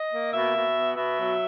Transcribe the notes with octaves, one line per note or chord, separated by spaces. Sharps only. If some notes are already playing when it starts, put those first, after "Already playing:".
Already playing: D#5
A#3
B2 E5
B2
B3
B2 E5
F#3